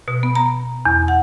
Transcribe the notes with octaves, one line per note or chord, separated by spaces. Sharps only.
B2
B3
A#5
E2
F#5